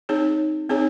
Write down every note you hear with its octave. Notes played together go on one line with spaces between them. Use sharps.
C4 D#4 G#4 C#5
C4 D#4 G#4 C#5